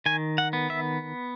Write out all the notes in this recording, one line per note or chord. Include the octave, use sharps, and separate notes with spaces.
D#3 G#5
F#5
B3
E5